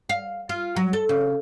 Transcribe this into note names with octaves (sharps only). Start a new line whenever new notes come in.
F5
F4
F#3
A4
C#3